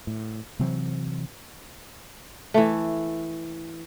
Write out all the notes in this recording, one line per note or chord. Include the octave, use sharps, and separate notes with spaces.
A2
C3 E3 F#3 C4
E3 A3